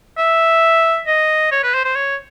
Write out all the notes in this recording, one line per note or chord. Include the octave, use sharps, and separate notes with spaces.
E5
D#5
C#5
B4
C5
C5
C#5